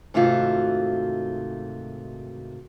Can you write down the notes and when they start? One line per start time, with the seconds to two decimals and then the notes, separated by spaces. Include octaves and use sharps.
0.14 G#2 C3 D#3 A3 F4 F#4